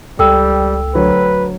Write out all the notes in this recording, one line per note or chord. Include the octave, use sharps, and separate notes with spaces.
C#2 G3 A4 G5 E6
D2 F#3 B4 C#5